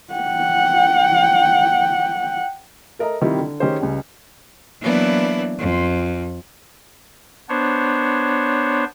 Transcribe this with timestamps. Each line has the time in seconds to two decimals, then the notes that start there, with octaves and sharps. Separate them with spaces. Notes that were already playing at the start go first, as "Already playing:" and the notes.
0.14 F#5 G5
2.99 A4 A#4 D#5 E5 A#5
3.21 C3 D#3 G3 E4 F4 G4
3.39 D3
3.60 D#3 C#4 G4 G#4 C5
3.80 C#2 C#3 G3
4.81 E3 F#3 A#3 B3 D4 E4
5.58 F2
7.49 B3 D4 C5 C#5